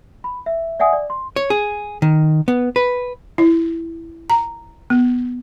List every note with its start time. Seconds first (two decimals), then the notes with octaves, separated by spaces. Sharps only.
0.24 B5
0.46 E5
0.80 D5 E5 F#5 G#5 D#6
0.93 D5
1.10 C6
1.36 C#5
1.50 G#4
2.02 D#3
2.48 B3
2.76 B4
3.38 E4
4.30 A#5
4.90 B3